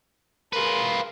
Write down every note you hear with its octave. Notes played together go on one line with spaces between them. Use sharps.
F4 G#4 A#4 B4